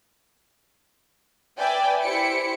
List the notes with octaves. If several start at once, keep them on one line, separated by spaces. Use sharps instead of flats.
B4 D5 E5 G5 G#5
E4 G4 C5 B6 C#7 D7